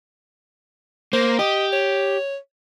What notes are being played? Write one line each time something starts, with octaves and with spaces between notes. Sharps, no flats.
A#3 C5
G4 D#5
C#5